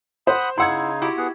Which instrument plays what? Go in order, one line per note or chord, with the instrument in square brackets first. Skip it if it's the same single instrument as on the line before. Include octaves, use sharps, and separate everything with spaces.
[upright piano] C5 [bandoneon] F#5 B5 D#6
[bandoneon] C#3 D#4 [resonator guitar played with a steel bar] E4 F#5 [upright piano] C6 E6 G#6
[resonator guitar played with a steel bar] E4 F#4 G4
[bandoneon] B3 G#4 F#5